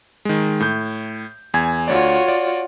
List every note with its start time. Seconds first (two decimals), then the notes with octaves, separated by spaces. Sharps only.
0.25 D#3 G#3
0.60 A2 G6
1.54 E2 G#5 G#6
1.88 D2 F4 F#4 C#5 D5
2.28 D5